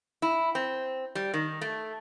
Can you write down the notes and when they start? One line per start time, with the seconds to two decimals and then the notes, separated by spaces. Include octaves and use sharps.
0.22 E4
0.55 C4
1.15 G3
1.34 D#3
1.61 A3